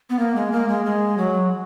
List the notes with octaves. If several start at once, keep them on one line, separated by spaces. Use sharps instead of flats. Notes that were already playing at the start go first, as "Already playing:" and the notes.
B3
A#3
G#3
A#3
G#3
G#3
F#3